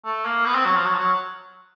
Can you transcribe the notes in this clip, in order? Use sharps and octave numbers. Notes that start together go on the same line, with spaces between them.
A3
A#3
B3
C4
F#3
F3
F#3
F3
F#3